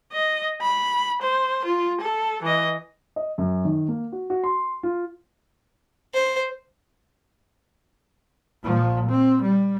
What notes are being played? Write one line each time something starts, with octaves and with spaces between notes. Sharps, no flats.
D#5
B5
C5
F4
A4
E3 D#5
D#5
F#2
D#3
A#3
F#4
F#4
C6
F4
C5
A#2 F3
C4
G3